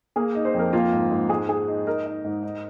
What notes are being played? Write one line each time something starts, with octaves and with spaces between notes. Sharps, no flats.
A#3 G#4
D#4
C5
F2
A#4
A#3 F4
G#2
G#2
G#3 G#4
G#3 G#4
D#4
D#4 A#4
D#4
G#2
D#4